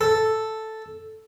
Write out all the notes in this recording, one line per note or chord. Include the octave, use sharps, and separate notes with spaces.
A4